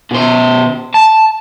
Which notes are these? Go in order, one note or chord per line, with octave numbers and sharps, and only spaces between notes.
B2 C5
A5